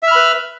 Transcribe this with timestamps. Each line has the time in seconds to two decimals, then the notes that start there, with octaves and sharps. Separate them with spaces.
0.03 E5
0.07 F6
0.12 B5
0.16 B4